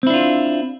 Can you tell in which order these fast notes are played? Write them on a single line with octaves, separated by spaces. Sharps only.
C4 E4 D4 F4